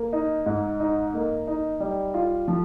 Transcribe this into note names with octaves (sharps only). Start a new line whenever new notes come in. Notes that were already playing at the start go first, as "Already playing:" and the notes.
Already playing: A#3
D#4
G#2
D#4
A#3
D#4
G3
F4
F3